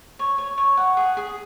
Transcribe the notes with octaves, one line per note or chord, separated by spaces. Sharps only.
C#5
C#5
C#5
F#5
G#4
G#4